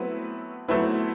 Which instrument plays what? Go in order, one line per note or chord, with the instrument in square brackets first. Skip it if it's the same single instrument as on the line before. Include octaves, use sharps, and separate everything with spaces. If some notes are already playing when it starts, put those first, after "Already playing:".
Already playing: [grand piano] F#3 A3 C4 E4 [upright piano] B3 B4
[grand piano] F#3 A3 C4 E4 [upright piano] B3 B4